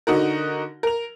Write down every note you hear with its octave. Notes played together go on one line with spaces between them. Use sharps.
D3 D#4 F#4 A#4
A#4 F7